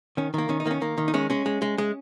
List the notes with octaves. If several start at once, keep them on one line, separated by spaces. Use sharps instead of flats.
D#3 C#4
D#3 A#3
D#3 C#4
D#4
D#3 A#3
C#4
D#3 A#3
D#3
D#4
G#3 C#4
G#3 C#4
G#3
G#3
G#3